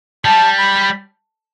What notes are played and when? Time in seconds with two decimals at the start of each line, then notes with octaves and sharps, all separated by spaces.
0.25 G3 A5
0.60 B5